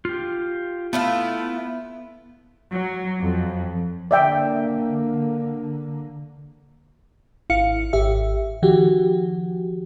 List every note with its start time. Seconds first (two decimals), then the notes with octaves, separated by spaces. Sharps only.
0.05 F4 G4
0.93 A3 B3 E4 F4
2.71 F#3
3.20 F2
4.11 D3 A#3 D5 E5 G5
7.50 G#1 E4 F5 C#7
7.93 G#1 G4 E5
8.62 D#3 F3 F#4 G4